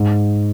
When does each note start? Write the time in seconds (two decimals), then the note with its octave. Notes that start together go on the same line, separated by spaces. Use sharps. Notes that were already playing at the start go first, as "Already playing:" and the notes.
Already playing: G#2